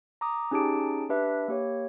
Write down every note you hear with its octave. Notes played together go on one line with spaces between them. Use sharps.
A#5 D6 D#6
C#4 D#4 G4 G#4 A5 D7
D4 G4 B4 E5
A#3 G4 C#5